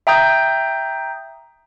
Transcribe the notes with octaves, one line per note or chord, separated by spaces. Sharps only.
E5 G5 A#5 D#6 G6